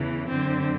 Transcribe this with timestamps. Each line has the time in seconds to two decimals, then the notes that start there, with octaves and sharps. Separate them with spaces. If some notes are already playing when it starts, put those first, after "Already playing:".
Already playing: E2 C#3 E3
0.28 F#2 D3 C4